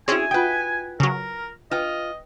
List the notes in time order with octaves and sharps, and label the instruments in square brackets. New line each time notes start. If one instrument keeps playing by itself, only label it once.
[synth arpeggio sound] C4 C#4 [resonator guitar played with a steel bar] E4 G#4 [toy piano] F#4 D5 [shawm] G#5
[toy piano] F4 F#5 D#6 [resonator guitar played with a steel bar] B4 G5
[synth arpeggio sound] C#3 F#3 [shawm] A#4
[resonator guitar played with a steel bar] F4 [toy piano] B4 G5 [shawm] D#5